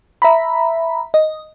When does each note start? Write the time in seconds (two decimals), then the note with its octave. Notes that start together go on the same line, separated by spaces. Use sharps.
0.22 E5 A#5 B5
1.14 D#5